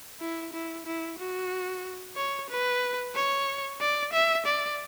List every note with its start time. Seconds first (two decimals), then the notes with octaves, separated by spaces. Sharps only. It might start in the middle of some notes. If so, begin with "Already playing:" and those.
0.21 E4
0.53 E4
0.86 E4
1.19 F#4
2.17 C#5
2.50 B4
3.15 C#5
3.81 D5
4.13 E5
4.46 D5